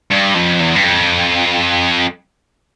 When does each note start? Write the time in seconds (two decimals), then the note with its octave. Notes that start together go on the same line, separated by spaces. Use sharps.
0.11 G2
0.34 F2
0.60 E2
0.76 G2
0.83 F2